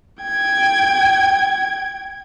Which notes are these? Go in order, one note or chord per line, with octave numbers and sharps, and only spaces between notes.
G5 G#6